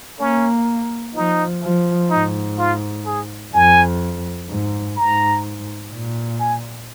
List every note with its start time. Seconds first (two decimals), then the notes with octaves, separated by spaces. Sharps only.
0.19 A#3 C#4
1.15 F3 D#4
1.63 F3
2.11 G#2 D#4
2.58 F4
3.06 G#4
3.54 F2 G#5
4.49 G#2
4.97 G#2 A#5
5.92 A#2
6.40 G#5